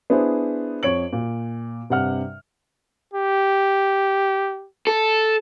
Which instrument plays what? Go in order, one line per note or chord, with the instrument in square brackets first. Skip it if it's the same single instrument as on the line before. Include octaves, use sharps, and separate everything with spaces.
[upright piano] B3 D4 E4 G#4 C5
F2 C#5 D7 F#7
A#2
G2 C3 F#5 F6
[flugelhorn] G4
[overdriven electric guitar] A4